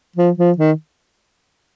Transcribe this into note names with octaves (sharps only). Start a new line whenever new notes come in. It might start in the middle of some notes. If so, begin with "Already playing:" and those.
F3
F3
D#3